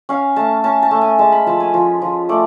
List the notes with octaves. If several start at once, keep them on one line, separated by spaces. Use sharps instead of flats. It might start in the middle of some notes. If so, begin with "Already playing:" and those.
C#4 F5
A3 A5
C#4 A5
A5
A3
G#5
G#3 A5
B5
F3 A5
G#5
F3
F3
A3 D5